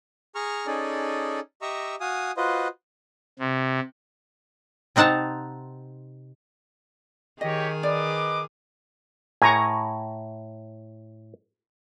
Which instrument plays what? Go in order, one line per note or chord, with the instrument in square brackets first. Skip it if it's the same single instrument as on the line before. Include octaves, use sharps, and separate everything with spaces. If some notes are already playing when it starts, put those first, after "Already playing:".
[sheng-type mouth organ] G#4 A#5 C#6 F6
C#4 D#4 G#4 A4 D5
G4 D#5 E5 A#5 C#6 E6
F#4 F5 G#5 D#6
F4 F#4 B4 C5 D#5
[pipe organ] C3
[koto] C3 C4 D#4 F#5 A5 A#5
[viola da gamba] D#3 G#4 [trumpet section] G4 C#5 [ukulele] D#5
[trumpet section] B4 D#5 D6 [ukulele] D5
[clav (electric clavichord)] A2 [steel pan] G#5 A#5 C#6